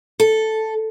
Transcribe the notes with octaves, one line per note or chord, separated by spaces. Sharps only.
A4